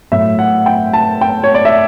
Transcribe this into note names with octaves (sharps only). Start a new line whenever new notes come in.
A2 F#3 E5
F#5
G5
A5
G5
C#5
D5
E5